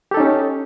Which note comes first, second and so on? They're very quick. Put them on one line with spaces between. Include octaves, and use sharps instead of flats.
G4 A4 D#4 C#4